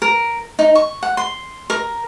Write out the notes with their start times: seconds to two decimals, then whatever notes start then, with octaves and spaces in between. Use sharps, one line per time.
0.02 A#4
0.59 D#4
0.75 C#6
1.03 F#5
1.17 C6
1.70 A#4